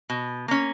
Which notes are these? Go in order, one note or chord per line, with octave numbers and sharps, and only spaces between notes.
B2
A#3 C#4